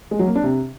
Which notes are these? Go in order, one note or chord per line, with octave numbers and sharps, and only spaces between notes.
G#3
F#3
A#3
D4
C3